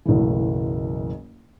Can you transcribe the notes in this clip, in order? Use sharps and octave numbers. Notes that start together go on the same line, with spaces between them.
F#1 B1 A2 E3